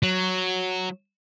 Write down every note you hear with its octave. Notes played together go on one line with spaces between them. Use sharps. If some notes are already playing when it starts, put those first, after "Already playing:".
F#3